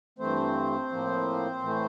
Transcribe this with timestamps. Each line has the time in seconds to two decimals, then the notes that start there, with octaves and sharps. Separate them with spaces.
0.19 G2 E3 A3 C4 C5
0.91 A2 F3 A#3
1.62 A2 E3 A3